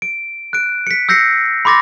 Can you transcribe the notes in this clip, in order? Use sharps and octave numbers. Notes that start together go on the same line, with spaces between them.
D7
F#6 D7
B6 C#7
E6 G6 A#6 C7 C#7
B5 C6 D6 A6 A#6